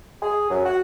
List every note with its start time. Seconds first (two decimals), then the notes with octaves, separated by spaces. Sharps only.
0.22 G#4
0.50 F#2
0.65 F#4